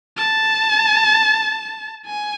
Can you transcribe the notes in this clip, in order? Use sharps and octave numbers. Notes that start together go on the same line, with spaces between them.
A5
G#5